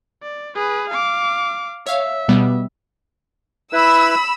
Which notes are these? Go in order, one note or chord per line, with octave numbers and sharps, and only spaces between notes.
D5
G#4 B4
F5 D6
C#5 E5 F5
B2 G3 B3
E4 B4 B5 E6